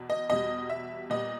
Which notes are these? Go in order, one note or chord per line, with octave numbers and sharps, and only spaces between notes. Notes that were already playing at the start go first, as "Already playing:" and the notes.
Already playing: E2 B2
D#5
E2 B2 G3 D#5
E5
A#2 G3 B3 D#5